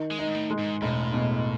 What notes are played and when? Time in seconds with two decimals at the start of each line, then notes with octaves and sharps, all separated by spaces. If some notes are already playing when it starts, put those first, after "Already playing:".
Already playing: D#3
0.11 G#3
0.19 D#4
0.27 G#2
0.35 A2
0.50 G#3
0.59 G#2
0.82 E1 A2
1.13 B2